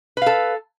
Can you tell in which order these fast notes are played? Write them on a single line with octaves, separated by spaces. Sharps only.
B4 F5 A4